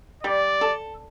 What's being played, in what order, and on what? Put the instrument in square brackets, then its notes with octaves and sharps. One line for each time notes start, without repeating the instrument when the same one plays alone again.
[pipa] G3 [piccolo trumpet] D5
[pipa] A4